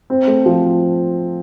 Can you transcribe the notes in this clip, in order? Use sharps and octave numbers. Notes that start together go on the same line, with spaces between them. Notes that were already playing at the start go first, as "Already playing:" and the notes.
C4
A3
F3